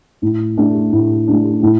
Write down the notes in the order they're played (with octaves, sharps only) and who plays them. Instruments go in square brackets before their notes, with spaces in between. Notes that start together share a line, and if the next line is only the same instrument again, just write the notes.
[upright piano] A2
A3 D4
A2
A3 D4
A2